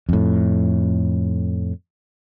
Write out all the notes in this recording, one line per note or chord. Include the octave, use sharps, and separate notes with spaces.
F2 A2